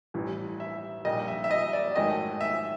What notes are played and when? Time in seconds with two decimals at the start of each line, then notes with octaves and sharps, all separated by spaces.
0.14 A1 G2 E3
0.60 E5
1.05 A#1 A#2 G3 D#5
1.28 E5
1.44 E5
1.51 D#5
1.73 D5
1.96 G#1 G#2 D#3 F#3 A3 D#5
2.41 E5